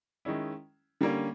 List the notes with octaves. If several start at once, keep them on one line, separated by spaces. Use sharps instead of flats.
D#3 G#3 C#4 E4
D3 G3 A#3 C#4